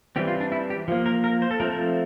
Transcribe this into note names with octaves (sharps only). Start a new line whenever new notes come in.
E3 G3 C4 G4
F4
D4
E4
G4
F3 A#3
A#4
A#4
C5
A4
F3 A3 C4 A#4
A#4